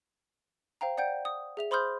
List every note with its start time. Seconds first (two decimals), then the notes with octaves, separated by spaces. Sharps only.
0.81 C5 F5 G5 A#5
0.98 D5 F#5 G5 G6 D7
1.25 D#6
1.57 G#4 E5 F7
1.71 C5 B5 C6 D#6 F6 G6